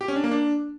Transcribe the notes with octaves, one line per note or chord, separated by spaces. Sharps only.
G4
C#4
D4
A#3
D4